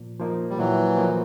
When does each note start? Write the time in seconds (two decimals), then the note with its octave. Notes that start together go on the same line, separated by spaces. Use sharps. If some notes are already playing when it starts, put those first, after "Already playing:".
Already playing: A#2 F3 A#3
0.19 F3 A#3 D#4
0.50 G3
0.58 A#2 E3 F#3
0.97 F3 A#3 D#4